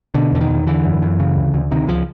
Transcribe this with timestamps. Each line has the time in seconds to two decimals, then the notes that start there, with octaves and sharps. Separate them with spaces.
0.14 B2 D3
0.32 E2 D3
0.41 D#3
0.50 E2
0.66 D3 E3
0.84 F#2
1.02 F#2
1.20 C#3
1.36 D2
1.54 D2
1.71 C3 D#3
1.88 C#2 F3